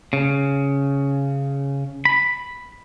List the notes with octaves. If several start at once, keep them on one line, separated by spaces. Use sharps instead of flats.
C#3
B5